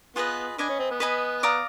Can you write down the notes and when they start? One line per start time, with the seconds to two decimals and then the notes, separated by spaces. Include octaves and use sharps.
0.16 B3 F4 G#4 B4 D#5
0.58 D4 B4 D#5 G#5 B5
0.69 C#4
0.79 C4
0.91 B3
1.00 B4 D#5 G#5 B5
1.43 D5 F5 A#5 D#6